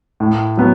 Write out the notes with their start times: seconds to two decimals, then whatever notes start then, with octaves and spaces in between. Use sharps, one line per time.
0.20 A2
0.57 F#3 B3